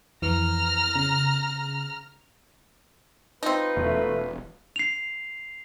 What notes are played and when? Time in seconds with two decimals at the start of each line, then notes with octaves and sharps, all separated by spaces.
0.22 F2 E3 A#5 F6
0.96 C#3
3.43 C4 D#4 F4 B4
3.76 E1 A3
4.76 C7 F7